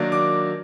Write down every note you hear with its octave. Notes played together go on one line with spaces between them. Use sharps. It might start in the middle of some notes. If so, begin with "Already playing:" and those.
Already playing: D#3 F#3 A#3 D4
D6